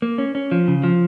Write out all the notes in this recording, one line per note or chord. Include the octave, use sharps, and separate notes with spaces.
A#3
C#4
C#4
F3
C#3
F3